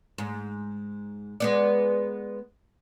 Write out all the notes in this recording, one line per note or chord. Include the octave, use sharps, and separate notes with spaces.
G#2
G#3 B3 D5